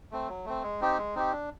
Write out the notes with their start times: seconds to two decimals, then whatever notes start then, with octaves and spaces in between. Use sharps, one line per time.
0.12 A3 C4
0.28 F#3
0.46 A3 C4
0.63 G#3
0.81 C4 D#4 G4
0.97 G#3
1.15 C4 D#4 G4
1.32 D4